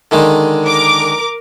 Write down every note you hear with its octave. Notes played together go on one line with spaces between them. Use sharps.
D3 D#3 G#3
A#4 D6